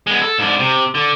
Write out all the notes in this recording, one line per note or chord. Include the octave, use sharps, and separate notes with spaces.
G#3 B3
A4
G#2 D4
C3
D3